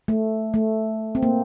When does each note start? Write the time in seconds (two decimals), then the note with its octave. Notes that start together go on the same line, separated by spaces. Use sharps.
0.08 A3
0.54 A3
1.15 C4
1.23 A#3